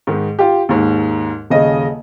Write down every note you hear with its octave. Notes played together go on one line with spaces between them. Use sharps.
G#2 D#3
F4 G4
D#2 G#2
D#1 C#3 D#5